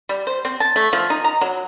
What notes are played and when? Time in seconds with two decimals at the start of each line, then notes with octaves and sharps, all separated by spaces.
0.09 G3
0.27 C5
0.45 C4
0.60 A5
0.76 A3
0.93 F3
1.10 D#4
1.24 A#5
1.41 F#3